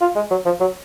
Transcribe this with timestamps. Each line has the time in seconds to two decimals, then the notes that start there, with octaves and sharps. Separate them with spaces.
0.01 F4
0.16 G#3
0.31 F#3
0.45 F3
0.60 F#3